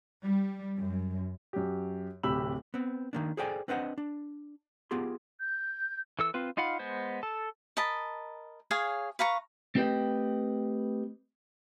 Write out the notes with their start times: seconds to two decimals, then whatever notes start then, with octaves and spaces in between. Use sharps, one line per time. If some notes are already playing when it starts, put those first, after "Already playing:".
0.24 G3
0.78 F#2
1.53 F#2 G4
2.23 D1 C3 G4 B5 E6 F#7
2.74 B3 C4
3.13 D#3 A#3 D4
3.37 G#4 A4 C5 D5 G5 G#5
3.68 C4 D4 B4 C5 D#5 F#5
3.98 D4
4.91 B3 F4 G4 G#4 C6
5.40 G6
6.19 E3 A4 E6
6.34 C4 F4 B4
6.57 D#4 F4 F5 F#5 B5
6.79 G#3 B3 C5
7.23 A4 A5
7.77 A#4 D#5 A5 B5
8.71 G#4 C#5 F5 G#5
9.19 B4 F5 A#5 C#6
9.75 A3 C4 G4 B4 D#5 G5